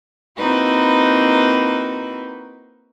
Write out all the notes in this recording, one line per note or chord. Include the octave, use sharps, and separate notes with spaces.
A#3 C4 D#4 E4 F#4 B4